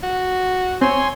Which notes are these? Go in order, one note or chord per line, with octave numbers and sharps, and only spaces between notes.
F#4
C4 C#5 G#5 C6